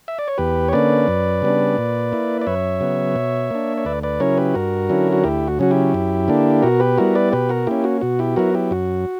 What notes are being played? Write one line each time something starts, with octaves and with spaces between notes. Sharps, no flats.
E5
D5
C#5
E2 G4 B4
C#5
D3 A#3 C#4 B4 D5
F#2
C#3 G3 B3 D4
A#2
A#3 E4
D5
F#2 C#5 E5
C#3 F#3 B3
B2
A#3 D4
C#5
D2 B4 D5
B4 D5
C#3 F#3 C#4 E4 A#4 C#5
G4 B4
G2 F#4 A#4
D3 F#3 C#4 E4
F#4
D2 E4 G4
F#4
C#3 F#3 C#4 F#4
E4 G4
F#2
D3 A#3 D4
B2 F#4 A#4
G4 B4
G3 B3 E4 F#4 A#4
B4 D5
B2 G4 B4
F#4 A#4
A#3 C#4 E4 G4
F#4
B2 F#4
E4 G4
F#3 B3 E4 F#4 A#4
E4 G4
F#2 F#4